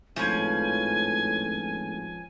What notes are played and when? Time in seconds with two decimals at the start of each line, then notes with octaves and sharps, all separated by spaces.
0.16 G#1 A2 F3 C#4 B4 G#5